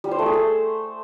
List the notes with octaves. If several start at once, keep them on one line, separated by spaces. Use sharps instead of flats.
G3
C5
A3
G#4
A3